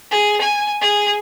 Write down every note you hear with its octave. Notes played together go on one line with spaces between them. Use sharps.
G#4
G#5
G#4